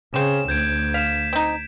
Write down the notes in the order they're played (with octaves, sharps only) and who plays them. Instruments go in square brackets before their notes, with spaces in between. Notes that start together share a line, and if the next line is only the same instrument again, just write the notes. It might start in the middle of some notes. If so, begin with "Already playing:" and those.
[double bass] C#3 [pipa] C4 C#4 [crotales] E7
[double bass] D2 [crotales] G6 G#6 D7
[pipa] F5 [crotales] B6 E7
[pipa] C4 D#4